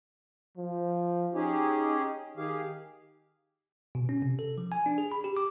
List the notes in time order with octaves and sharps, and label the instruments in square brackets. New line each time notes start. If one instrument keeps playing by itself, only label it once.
[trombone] F3
[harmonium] C#4 G4 G#4 [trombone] D#4
[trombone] D#3 [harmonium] G4 G#4 F5
[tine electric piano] B2
C#4
C3
A4
F3
G#5
D4
G#4
B5
G4
D6